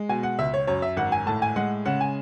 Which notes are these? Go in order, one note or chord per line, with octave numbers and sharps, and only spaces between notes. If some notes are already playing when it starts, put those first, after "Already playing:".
Already playing: G#3
B2 G#5
F#5
C#2 E5
C#5
F#2 C#5
E5
G#1 F#5
G#5
A2 A5
G#5
G#3 F#5
C#3 F#5
G#5